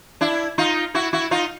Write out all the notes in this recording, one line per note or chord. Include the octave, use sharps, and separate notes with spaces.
D4 E4
D#4 F4
E4 F#4
E4 F#4
D#4 F4